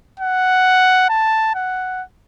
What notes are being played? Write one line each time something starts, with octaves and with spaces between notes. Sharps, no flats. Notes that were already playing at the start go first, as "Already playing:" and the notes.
F#5
A5
F#5